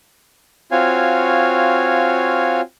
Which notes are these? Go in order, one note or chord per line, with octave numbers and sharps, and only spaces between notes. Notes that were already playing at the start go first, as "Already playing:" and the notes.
C4 F4 F#4 C#5 F5 G#5